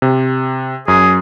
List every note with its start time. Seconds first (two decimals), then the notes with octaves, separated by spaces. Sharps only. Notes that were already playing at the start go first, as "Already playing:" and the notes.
0.02 C3
0.88 F#2 G#4